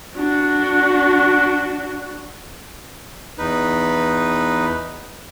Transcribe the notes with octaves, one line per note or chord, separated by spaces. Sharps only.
D4 F#4
E2 D#4 B4